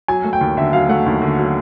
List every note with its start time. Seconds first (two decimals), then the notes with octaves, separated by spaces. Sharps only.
0.08 F#3 G#5
0.24 A3
0.33 G5
0.41 D#2
0.57 D3 E5
0.73 F#3 F5
0.89 A3 F#5
1.06 D#2
1.22 D3
1.39 F#3